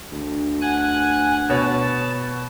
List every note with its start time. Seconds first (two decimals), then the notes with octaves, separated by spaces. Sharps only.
0.12 D2
0.61 F#5 G#5 F#6
1.50 B2 C#5 A5 B5